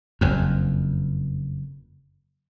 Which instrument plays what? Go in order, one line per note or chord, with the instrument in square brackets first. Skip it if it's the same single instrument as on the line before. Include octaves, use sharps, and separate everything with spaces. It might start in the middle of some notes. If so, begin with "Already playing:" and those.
[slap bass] F#1 F2